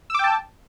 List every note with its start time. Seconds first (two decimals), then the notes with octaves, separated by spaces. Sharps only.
0.10 E6
0.15 D6
0.19 G5
0.24 A5